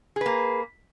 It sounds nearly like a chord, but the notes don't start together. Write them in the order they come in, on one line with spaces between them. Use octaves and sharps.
G#4 B4 A#3